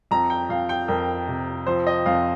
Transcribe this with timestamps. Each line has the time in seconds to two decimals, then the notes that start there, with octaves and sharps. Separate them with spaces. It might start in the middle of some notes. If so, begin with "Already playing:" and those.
0.11 F2 A#5
0.30 G5
0.49 F2 F5
0.69 G5
0.88 F2 A#4
1.28 C3
1.67 F3 C5
1.87 D#5
2.06 F2 F5